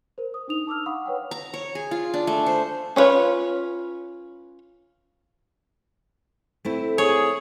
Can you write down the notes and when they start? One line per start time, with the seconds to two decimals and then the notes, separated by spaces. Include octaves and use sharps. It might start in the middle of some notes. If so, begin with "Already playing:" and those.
0.18 A#4 C5
0.34 D#6
0.48 D4 D#4 D#6 F7
0.67 A5 D6 E6 F6
0.86 F5 F#5 B5 C#6 D#6
1.06 B4 C#5 F#5 G5
1.31 A#5
1.54 C#5
1.75 G#4
1.91 F4
2.14 D4
2.27 A3
2.46 C5
2.96 C#4 D4 F4 B4 C#5
6.65 A3 C4 E4
6.98 G#4 C#5